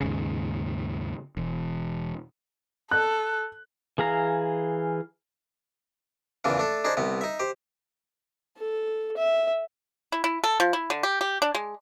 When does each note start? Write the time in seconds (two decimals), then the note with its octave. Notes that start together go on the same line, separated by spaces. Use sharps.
0.01 D#2 G#2 C#3
1.37 E1 E2
2.91 A4 F#6
3.98 E3 G#4 F5 A#5
6.44 E2 A#2 C#3 E3 D4
6.58 A3 D4 A4
6.84 D4 D#4 G#4 C5
6.97 C2 C3 B3
7.21 D#4 E5
7.40 G4 C5
8.58 A4
9.17 E5
10.12 E4
10.24 E4
10.44 A4
10.60 F3
10.73 E4
10.90 D3
11.03 G4
11.21 G4
11.42 D4
11.55 G#3